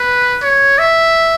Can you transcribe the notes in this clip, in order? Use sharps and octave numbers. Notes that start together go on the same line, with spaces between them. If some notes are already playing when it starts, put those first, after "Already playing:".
Already playing: B4
C#5
E5